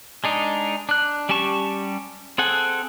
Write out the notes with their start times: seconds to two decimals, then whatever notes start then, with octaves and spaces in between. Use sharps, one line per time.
0.24 G#3 D4 D#4
0.89 D4 F#6
1.29 G3 C#4 G4 A5 C#6
2.38 C4 G#4 A4 F#5 G#5